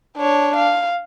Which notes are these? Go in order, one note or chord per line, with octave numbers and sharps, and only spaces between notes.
D4 C#5
F5